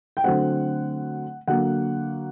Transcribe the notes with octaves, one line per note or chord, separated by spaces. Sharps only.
G5
D3 F#3 A3 C4 F#5
D3 F#3 A#3 F#5